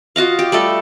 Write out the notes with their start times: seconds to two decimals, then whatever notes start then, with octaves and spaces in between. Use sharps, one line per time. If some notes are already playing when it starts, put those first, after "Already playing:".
0.16 F4 F#4 D#5 F5
0.39 G4
0.52 G3 A3 A4